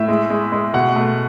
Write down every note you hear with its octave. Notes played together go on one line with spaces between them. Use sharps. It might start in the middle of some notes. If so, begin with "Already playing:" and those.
Already playing: A2 E5
G#3
G#3
G#3
B2 F#5
A3